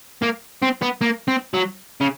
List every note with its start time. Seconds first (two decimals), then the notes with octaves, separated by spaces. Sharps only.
0.23 A#3
0.63 C4
0.82 B3
1.01 A#3
1.28 C4
1.54 F#3
2.01 C#3